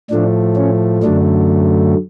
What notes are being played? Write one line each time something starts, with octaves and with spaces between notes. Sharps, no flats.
A2 F3 A3 D4
C#4
F#2 D3 F#3 A3 D4